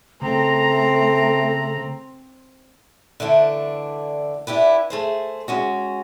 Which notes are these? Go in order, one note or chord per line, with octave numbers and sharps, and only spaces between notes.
C#3 A3 C4 A#5
D3 E3 A3 D4
D4 E4 G4 B4
A3 G#4 C5
G#3 C#4 F#4